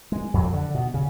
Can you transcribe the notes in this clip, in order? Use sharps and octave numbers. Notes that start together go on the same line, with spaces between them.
G#3
F2 F#3
D3
B2
C#3